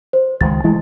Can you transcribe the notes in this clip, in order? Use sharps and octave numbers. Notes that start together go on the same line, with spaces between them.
C5
C#2 D#3 G#3 A6
E3 G#3 A3 E4